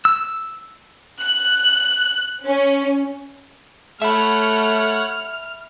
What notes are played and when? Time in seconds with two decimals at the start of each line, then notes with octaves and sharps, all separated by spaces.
0.05 E6
1.21 F#6
2.45 C#4
4.02 A3 C#5 E5 F#5 B5 F6